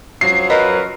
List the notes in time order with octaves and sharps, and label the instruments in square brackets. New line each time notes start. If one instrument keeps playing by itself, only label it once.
[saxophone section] F#2 F3 F#3 [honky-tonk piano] C7
[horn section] A#4 B4 [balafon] D#5